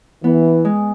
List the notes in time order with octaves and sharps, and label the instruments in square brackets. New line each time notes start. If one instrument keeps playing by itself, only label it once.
[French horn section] E3 [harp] B3
[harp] G#3